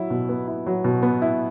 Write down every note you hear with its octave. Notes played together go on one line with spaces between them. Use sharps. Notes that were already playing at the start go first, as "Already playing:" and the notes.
Already playing: F#3 E4
B2
B3
E4
F#3
B2
B3
E4